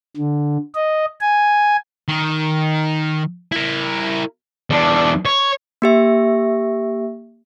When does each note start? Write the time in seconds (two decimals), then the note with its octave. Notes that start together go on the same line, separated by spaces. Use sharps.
0.17 D3
0.74 D#5
1.20 G#5
2.08 D#3
3.52 E4 A#4
4.70 E2 D4
5.25 C#5
5.82 A#3 G4 E5